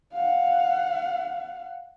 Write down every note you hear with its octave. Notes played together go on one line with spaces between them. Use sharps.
F5 F#5